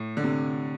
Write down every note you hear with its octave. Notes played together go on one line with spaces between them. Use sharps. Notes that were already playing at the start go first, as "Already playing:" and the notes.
Already playing: A2
D3
C3